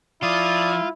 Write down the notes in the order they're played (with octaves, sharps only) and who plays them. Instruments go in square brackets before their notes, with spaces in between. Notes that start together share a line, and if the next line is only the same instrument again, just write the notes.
[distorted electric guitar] F3 [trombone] E4 [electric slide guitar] F4 [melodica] D5 D#6